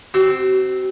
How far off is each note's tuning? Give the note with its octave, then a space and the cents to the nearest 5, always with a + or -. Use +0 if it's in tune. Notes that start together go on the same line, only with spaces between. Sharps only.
C4 +0 F#4 +40